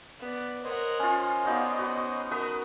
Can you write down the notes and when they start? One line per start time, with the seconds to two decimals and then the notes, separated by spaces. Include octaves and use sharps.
0.20 B3 D5
0.64 A#4 C5 C#5 D#5 F#5
0.99 C#4 F4
1.46 B3 D#4 F#4 D5
1.79 F#4 B4
2.31 F#4 A#4 B4 C#6 D#6